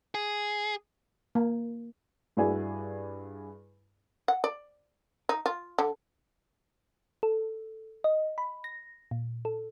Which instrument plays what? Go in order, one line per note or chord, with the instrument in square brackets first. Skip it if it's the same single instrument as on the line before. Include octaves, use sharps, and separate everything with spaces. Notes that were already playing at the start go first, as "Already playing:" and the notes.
[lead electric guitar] G#4
[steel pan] A#3
[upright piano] G2 E4 F#4 G#4 D5 G#5
[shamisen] F#5
D5
D#4
F4
D3
[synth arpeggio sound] A4
D#5
B5
A#6
A#2
A4